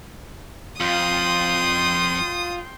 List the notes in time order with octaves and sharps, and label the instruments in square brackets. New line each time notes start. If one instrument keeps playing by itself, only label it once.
[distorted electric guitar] F2 [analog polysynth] F4 [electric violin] G5 C6 [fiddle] D#6